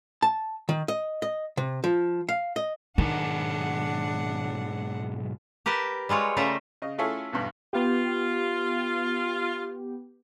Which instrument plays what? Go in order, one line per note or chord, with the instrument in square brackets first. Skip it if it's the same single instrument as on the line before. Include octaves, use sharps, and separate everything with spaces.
[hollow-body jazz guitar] A5
D#3
D#5
D#5
C3
F3
F5
D#5
[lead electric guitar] B1 G#2 [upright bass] D#3 [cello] D4 F#5
[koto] G4 A#4 B4 A5
G3 G#3 F4 C#5
C#3 G3 A3 F4 A#4 E5
[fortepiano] C#3 D#5
A3 C#4 E4 F4 G#4 A4
B1 E2 G2 B2
[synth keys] B3 G4 [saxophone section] F4